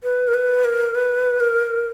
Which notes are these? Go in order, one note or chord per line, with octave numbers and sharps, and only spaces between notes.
B4
A#4
B4
A#4
B4
A#4